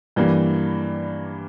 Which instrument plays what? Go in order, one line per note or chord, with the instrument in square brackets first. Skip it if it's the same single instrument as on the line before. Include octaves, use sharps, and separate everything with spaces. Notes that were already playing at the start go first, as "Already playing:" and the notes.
[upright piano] G2 E3 G3 A#3